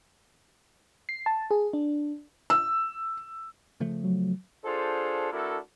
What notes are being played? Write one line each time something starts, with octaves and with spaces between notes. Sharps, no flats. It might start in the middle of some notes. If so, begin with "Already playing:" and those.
C7
A5
G#4
D4
E6
C#3 F3 A3
F#3
D4 F4 G#4 A4 C5
A3 D4 E4 F#4 A4 A#4